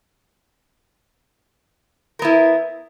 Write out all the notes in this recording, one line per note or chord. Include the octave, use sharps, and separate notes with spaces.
B3 E4 A#4